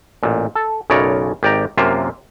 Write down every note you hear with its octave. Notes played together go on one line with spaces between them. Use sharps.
A1 A#2
A4
B1 F#2 C#3 A#4 C#5 D5
G#1 G4 D5 G5 A#5
F#2 C3 A#3 F4 E5